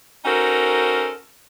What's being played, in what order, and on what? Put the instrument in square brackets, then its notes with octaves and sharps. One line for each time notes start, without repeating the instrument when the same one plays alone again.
[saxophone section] C#4 D#4 F#4 A4 A#4 C5